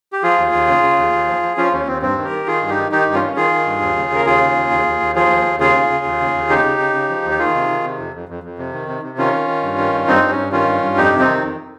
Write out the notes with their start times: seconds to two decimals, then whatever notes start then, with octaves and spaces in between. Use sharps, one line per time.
0.13 G4
0.23 F3 F4 G#4
0.38 D#2
0.53 D#2
0.68 C#3
0.83 C#3
0.97 D#2
1.13 D#2
1.28 F3
1.43 F3
1.57 F3 C#4 F4
1.72 D#2 C#4
1.87 D#2 C4
2.02 G2 C4
2.17 D#3
2.24 G4 A#4
2.32 D#3
2.47 D#3 F4 G#4
2.62 G2
2.69 D#4 G4
2.77 D#3
2.91 D#3 D#4 G4
3.07 G2
3.14 C#4 F4
3.21 D#3
3.36 D#3 F4 G#4
3.51 D#3
3.66 G2
3.81 D#2
3.96 C#3
4.10 C#3 A#4
4.26 D#2 F4 G#4
4.41 C#3
4.55 D#2
4.70 D#2
4.86 D#2
5.00 D#2
5.15 F3 F4 G#4
5.30 D#2
5.45 D#2
5.60 C#3 F4 G#4
5.75 C#3
5.90 C#3
6.05 D#2
6.20 C#3
6.35 D#2
6.49 C#3 D#4 G4
6.64 C#3
6.79 C#3
6.94 C#3
7.09 F3
7.24 D#2
7.31 G4
7.39 D#3 F4 G#4
7.54 C3
7.69 D#3
7.84 C3
7.99 F2
8.14 F2
8.29 F2
8.43 F2
8.58 C3
8.73 D#3
8.88 C3
9.03 C3
9.18 D#3 C#4 F4
9.33 D#3
9.48 D#3
9.63 G2
9.78 D#3
9.93 G2
10.08 G2 C4 D#4
10.23 G2
10.30 C#4
10.38 G2
10.52 D#3 C#4 F4
10.68 G2
10.82 G2
10.97 F2 D#4 G4
11.12 C3
11.19 C4 D#4
11.27 D#3
11.42 F2